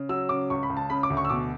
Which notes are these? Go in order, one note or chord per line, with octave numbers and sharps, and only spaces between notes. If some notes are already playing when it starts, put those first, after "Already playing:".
Already playing: C#3
F#3 E6
C#3 D6
C#2 C#6
B5
C#2
A5
C#3 B5
D6
D2
C#6
E6
B2 D6